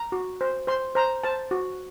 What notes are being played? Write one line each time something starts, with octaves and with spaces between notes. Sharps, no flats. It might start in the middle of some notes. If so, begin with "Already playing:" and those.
Already playing: A#5
F#4
C5
C5 C6
C5 A#5
C5 A5
F#4